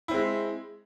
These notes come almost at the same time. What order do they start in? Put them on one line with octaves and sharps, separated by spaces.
E4 C4 G#3